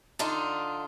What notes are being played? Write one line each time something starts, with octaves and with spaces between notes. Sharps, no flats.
D3 D4 D#4 F4